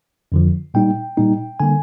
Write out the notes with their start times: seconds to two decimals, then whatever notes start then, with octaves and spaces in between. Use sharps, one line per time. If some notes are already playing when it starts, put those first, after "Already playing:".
0.32 F2 D3 F3
0.74 A#2 G3 A#3 D#4 G5
1.17 A#2 G3 A#3 D#4
1.60 D3 G3 A#3 G#5